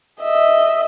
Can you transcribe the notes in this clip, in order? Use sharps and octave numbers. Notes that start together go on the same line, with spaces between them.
D#5 E5